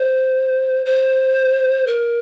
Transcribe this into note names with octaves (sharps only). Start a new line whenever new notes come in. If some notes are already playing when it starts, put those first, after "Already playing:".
Already playing: C5
C5
A#4